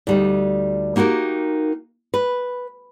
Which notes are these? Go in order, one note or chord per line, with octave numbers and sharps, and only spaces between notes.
D2 G3 D#4
A#3 D#4 F#4 G4 A#4
B4